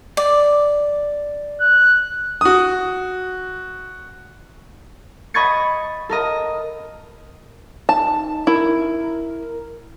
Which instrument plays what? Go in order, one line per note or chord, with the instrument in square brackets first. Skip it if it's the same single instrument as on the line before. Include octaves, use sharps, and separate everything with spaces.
[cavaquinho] D5
[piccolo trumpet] F#6
[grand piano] F#4 D#6
[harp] D#5 B5 C#6 G#6 A6 C#7
A4 A#4 D#5
[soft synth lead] D#4 [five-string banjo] A5
[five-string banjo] E4 [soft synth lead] A#4